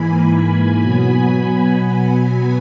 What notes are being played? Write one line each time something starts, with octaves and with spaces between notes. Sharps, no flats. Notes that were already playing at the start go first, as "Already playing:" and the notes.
Already playing: G#2 E3 A#3 G#5 B5
G#5 B5
B2 F#3 B3